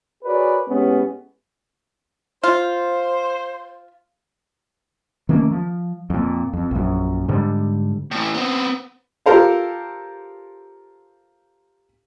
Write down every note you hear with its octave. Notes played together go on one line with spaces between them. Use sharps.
F#4 G#4 A#4 B4 C#5 D5
A2 G#3 B3 C#4 G4
F4 C5
D#3 A3 A#3 C#4
F3
F2 A#2
F2
A#1 F#2
G#2 D3 G3
A2 E3
B3 C4
F4 G4 A4 A#4 C5 F5